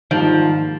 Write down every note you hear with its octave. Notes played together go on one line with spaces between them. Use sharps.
G#2 D#3 F3 G3 A#3 F4